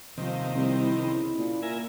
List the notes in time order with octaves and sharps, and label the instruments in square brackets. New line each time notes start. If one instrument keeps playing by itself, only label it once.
[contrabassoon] D#1 [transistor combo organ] C3 D#3 [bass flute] F3
[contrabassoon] C2
[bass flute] E4
[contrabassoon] C#3 [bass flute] E4
[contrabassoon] A#2
[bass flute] F4 [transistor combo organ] A#4 E5 G#5